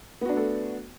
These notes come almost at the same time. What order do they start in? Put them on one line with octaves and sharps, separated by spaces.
B3 F#4 D4 A3 A4